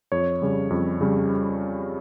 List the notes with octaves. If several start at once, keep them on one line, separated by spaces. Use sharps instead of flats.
F2 C#5
C#3 G3
F2
C#3 G3